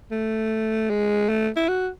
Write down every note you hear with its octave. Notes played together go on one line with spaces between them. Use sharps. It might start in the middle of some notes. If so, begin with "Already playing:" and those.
A3
G#3
A3
E4
F#4